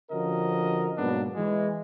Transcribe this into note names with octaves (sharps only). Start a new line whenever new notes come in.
D3 F3 C#4 F#4 A#4 D#5
G#2 B2 F#3 A#3 B3 D4
E3 G#3